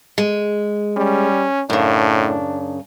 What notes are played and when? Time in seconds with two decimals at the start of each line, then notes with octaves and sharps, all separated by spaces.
0.18 G#3
0.97 G3 C#4
1.70 F#2 A2 C#3 D4